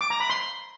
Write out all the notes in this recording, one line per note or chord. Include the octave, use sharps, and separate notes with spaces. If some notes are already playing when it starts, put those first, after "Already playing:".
D6
A#5
B5
C6